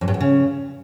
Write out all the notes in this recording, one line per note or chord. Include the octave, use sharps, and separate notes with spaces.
F2
G2
E2
C#3